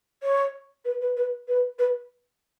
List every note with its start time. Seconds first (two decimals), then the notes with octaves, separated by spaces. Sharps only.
0.23 C#5
0.85 B4
1.01 B4
1.16 B4
1.48 B4
1.78 B4